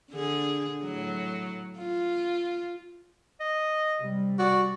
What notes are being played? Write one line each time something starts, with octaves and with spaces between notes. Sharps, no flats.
D3 G#4
A2 F#3
F4
D#5
C3 G3
F#4 D5